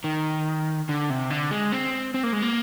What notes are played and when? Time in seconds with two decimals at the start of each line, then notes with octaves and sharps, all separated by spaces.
0.04 D#3
0.89 D3
1.10 C3
1.30 D3
1.51 G#3
1.72 C4
2.14 C4
2.23 A#3
2.33 G#3
2.42 A#3